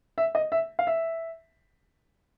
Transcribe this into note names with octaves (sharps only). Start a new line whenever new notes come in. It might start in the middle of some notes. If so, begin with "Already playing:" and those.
E5
D#5
E5
F5
E5